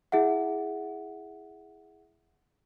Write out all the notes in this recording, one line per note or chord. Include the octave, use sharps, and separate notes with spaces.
E4 G#4 E5 F#5